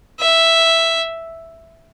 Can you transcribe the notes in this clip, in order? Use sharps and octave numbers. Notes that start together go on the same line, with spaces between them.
E5